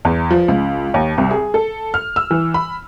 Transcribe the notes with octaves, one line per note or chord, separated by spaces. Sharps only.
E2
F3
C#2
D#2
C2
G#4
A4
F6
E6
E3
B5